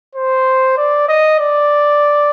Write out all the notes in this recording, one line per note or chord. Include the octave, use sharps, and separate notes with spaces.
C5
D5
D#5
D5